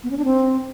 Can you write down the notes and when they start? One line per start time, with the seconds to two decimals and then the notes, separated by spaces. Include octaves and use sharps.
0.04 B3
0.11 C#4
0.18 D4
0.25 C4